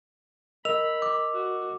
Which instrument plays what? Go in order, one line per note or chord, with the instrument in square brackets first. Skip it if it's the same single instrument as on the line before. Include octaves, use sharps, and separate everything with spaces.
[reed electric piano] A#4 D#5 E6 [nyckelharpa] B5 [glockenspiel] F7
[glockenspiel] D6
[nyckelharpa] F#4